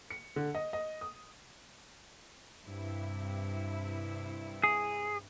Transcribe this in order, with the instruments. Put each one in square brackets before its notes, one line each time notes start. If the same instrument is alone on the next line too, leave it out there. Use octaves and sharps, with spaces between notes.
[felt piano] C#7
D3
D#5
D#5
D#6
[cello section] G2 C3 E4
[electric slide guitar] G#4